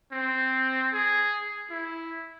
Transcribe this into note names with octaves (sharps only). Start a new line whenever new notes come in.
C4
G#4
E4